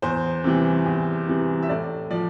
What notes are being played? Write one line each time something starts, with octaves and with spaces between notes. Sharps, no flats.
E2 C5
C3 E3 G3
E2
C3 E3 G3
E5
A2 D5
F3 D5